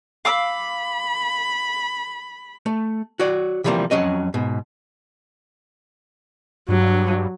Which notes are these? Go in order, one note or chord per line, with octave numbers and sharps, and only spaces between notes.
F5 B5 D6 E6
A3
F#4 C#5 D5
C3 E3 F3 G3 A3 A#3
F2 F#3 C#4 D#5
G#2 B2
G2 F#3